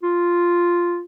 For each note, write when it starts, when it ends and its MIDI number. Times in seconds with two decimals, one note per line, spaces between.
0.03 1.02 65